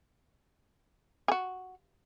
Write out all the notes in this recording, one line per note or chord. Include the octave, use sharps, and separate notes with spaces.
F#4 G#4